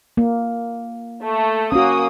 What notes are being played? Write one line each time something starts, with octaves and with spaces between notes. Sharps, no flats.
A#3
A3
A#3 C#4 F#4 D#6